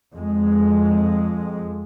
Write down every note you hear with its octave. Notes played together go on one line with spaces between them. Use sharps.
F2 G#3